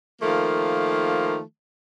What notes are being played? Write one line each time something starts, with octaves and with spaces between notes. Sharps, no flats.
D#3 F3 A3 A#3